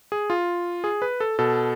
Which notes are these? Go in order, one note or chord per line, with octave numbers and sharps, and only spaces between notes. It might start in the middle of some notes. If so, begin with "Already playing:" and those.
G#4
F4
G#4
B4
A4
B2 A4